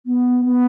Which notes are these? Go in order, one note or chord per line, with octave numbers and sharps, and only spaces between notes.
B3
B3